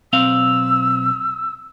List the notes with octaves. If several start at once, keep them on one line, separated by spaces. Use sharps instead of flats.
B1 C4 F5 E6